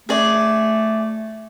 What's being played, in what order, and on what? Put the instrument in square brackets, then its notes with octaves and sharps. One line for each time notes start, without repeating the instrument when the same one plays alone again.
[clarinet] A3 [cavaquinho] G#4 D5